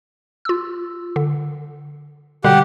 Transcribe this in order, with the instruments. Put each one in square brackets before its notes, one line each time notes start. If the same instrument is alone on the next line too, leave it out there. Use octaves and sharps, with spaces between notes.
[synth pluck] F4 E6
D3
[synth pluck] B2 D3 G3 [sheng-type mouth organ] G4 F#5